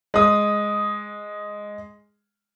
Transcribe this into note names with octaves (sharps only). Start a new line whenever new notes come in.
G#3 D#6